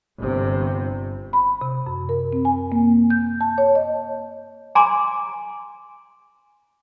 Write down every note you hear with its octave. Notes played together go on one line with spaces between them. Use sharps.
G1 C3
B5
C3
F#2
A#4
C4
G#5
A#3
G6
A5
C#5
D#5
G#5 A#5 C6 D6